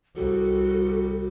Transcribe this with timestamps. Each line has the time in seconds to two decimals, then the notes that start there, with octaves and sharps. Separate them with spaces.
0.16 C2 G3 F#4 A4